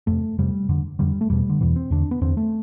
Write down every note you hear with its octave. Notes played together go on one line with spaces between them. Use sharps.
F2 C3 A3
F2 C3 G3
F2 D3
F2 D3 G3
A3
E2 B2 G3
D3
E2 B2 E3
C4
E2 D3 D4
B3
E2 D3 C4
A3